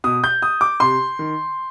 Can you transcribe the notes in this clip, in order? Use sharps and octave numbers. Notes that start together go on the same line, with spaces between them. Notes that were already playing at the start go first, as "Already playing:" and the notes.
B2 D#6
G6
D#6
D6
C3 C6
D#3